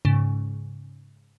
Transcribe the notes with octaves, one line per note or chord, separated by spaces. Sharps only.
G#2 C#3